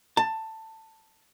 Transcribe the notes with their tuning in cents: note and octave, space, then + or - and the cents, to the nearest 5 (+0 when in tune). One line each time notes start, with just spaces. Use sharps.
A5 +15